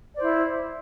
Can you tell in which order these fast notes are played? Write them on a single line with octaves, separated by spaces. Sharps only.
D5 C5 E4